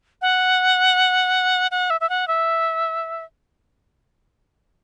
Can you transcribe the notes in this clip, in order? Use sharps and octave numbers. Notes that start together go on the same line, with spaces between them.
F#5
F#5
E5
E5
F#5
E5